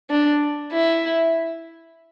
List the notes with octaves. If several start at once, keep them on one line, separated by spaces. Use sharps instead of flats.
D4
E4